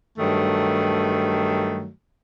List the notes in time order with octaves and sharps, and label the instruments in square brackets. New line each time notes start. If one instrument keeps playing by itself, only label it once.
[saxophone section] G2 D#3 F#3 A3